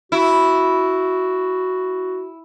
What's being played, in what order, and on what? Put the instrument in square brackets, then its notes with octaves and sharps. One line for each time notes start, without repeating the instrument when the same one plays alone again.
[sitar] E4 [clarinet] F#4